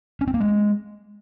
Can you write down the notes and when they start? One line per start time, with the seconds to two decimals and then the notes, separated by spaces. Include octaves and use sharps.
0.21 C#4
0.27 C4
0.34 A#3
0.40 G#3